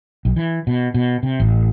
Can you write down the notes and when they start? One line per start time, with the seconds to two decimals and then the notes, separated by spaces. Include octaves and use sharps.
0.25 B1
0.36 E3
0.67 B2
0.94 B2
1.23 C3
1.40 A1